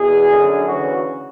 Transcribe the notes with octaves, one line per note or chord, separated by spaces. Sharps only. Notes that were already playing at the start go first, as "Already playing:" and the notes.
Already playing: E2 B2 G#4
F#2 D3
D2 C#3 E3 F#4